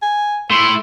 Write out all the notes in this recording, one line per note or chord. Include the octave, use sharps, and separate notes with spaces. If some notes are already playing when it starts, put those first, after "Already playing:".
G#5
A3 E4 C6